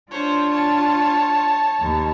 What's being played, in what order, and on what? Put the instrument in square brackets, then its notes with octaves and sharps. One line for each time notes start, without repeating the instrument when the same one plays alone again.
[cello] D4 F4 [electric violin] C5 C#5
[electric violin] C#5 A5
[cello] D#2